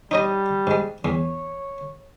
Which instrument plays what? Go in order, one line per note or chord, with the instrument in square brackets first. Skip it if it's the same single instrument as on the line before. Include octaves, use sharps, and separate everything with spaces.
[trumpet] G3 [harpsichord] D#4 C#5 D#5
[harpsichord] G#2 G#3
[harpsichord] E2 E3 [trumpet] C#5